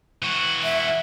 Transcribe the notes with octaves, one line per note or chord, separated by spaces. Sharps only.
E3 F#4
E5